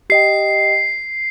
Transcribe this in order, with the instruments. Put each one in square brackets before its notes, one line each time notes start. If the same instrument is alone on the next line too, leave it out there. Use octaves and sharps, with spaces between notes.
[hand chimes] G4 D#5 G5 [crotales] C7